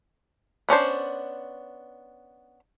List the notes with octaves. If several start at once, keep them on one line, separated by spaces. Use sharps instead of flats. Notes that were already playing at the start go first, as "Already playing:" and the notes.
B3 C#4 D4 C5